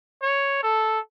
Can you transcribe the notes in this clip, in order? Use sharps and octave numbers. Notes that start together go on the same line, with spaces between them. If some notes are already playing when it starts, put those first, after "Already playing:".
C#5
A4